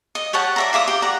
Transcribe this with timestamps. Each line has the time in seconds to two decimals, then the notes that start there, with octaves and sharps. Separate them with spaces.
0.15 D#5
0.33 G4 C#5 F#5 A5
0.56 D5 E5 A#5
0.73 F4 E5 D6 D#6
0.88 G4
1.02 D5 F#5 A#5